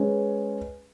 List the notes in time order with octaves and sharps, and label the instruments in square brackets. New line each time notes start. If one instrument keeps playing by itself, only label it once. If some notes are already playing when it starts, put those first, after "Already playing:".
Already playing: [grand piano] G#3 C#4 G#4 B4